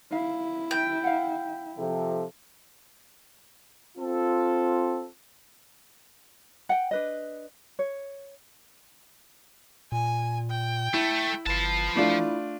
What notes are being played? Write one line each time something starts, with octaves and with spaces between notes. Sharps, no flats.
E4 F5
G5
F5 F#5
C3 F3 A4
C4 F4 A4
F#5 G5
D4 B4 D#5
C#5
A#2 G#5
G5
A3 E4
G1 F3 B4 A5
A3 D4 E4 F4